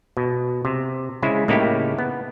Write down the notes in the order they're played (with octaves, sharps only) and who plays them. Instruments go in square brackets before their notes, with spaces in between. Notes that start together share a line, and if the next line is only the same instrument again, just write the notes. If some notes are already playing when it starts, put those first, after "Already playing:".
[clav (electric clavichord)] B2
C3
C#3 G#3 E4 C5
A2 C#3 A#3 D#4 E4 G4
B3